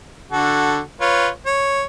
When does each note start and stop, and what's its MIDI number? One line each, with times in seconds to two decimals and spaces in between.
0.32 0.80 50
0.32 0.80 66
0.32 0.80 69
1.01 1.28 65
1.01 1.28 71
1.01 1.28 73
1.46 1.84 73